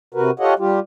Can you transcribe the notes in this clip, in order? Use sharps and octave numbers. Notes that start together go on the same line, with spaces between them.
C3 F#4 A#4 B4
F4 G4 A4 C#5 D#5 F#5
G3 F4 G4